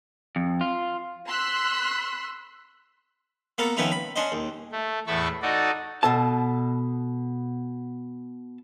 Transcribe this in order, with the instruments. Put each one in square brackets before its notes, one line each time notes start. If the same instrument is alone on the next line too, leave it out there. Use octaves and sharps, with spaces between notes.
[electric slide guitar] F2
F4
[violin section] C6 E6 F#6 B6
[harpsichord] A#3 B3 A4 A#4
D#3 F3 B3 C#4 D#4 E4
B5
C#4 D4 C5 D#5
D#2
[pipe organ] A3
E2 A2 A3 A5 B5 C#6
D#4 F#4 A4 D5 D#5
[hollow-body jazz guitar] B2 A4 A5